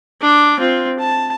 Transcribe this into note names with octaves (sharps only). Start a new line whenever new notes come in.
D4 D6
C4 F4
A5